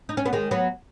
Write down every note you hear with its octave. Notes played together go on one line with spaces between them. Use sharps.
D#4
C#4
B3
D#3 G#3
F#3 B3